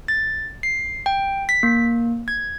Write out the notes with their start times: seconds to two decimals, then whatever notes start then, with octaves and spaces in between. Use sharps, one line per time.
0.08 A6
0.63 C7
1.06 G5
1.49 B6
1.63 A#3
2.28 G#6